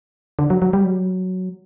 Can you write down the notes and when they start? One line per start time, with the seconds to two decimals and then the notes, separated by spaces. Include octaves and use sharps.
0.39 D3
0.50 F#3
0.62 F#3
0.73 G3
0.84 F#3